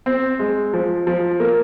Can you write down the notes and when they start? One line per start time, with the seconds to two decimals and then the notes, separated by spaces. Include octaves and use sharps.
0.06 C4
0.39 G#3
0.73 F3
1.07 F3
1.40 A#3